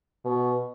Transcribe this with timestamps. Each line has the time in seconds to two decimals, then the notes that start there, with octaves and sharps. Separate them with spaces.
0.25 B2